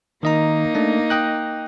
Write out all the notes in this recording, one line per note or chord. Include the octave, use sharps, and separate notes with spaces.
D#3 A#3 D#4 D#5 A#5
A3 D4
D#5 G5 F#6